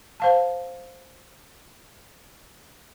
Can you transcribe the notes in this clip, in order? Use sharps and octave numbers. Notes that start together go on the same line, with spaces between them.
C5 F5 A5